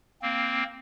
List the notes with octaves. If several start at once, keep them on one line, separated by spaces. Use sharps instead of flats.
A#3 C4